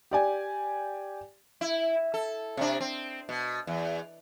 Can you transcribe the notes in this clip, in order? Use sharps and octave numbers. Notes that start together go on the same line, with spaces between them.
G4 D5 G#5
E4
A4
C3 D4
C4
B2
E2